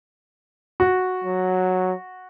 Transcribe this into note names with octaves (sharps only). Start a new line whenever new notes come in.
F#4
F#3